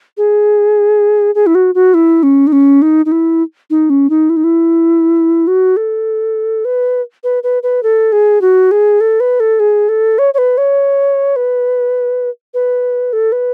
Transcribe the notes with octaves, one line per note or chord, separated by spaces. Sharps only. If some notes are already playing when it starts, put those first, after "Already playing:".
G#4
G#4
E4
F#4
F#4
E4
C#4
D#4
C#4
D#4
D#4
E4
D#4
C#4
D#4
E4
D#4
E4
F#4
A4
B4
B4
B4
B4
A4
G#4
F#4
G#4
A4
B4
A4
G#4
A4
C#5
C#5
B4
C#5
B4
B4
A4
B4